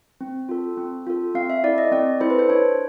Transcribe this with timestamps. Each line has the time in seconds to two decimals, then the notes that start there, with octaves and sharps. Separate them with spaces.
0.21 C4
0.49 F4 A4
0.77 C4
1.07 F4 A4
1.35 C4 F5
1.50 E5
1.64 E4 A4 D5
1.78 D#5
1.92 C4 D5
2.20 E4 A4 C5
2.30 B4
2.39 C5
2.49 D4 C#5